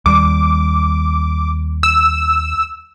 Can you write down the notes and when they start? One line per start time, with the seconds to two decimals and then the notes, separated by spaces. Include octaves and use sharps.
0.06 D#2 G3 D6
1.83 E6